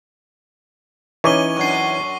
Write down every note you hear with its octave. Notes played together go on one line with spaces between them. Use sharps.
E3 C#4 D#4 C#5 C#6 D6 D#7 G7
F#2 D4 C#6 C7